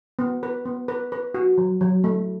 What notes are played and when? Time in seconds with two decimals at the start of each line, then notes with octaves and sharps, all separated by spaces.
0.19 B3
0.43 B4
0.65 B3
0.88 B4
1.12 B4
1.34 F#4
1.58 F#3
1.81 F#3
2.04 A3